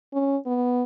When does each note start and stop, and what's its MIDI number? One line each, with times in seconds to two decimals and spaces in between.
0.13 0.37 61
0.46 0.83 59